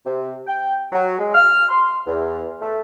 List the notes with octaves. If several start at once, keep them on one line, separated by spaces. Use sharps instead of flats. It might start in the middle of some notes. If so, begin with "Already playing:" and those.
C3
G5
F#3
G#3
F6
C6
E2
A3